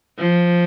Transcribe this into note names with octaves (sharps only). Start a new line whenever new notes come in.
F3